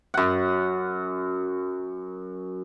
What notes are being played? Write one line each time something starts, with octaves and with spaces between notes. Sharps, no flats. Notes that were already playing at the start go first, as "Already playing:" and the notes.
F#2 F#5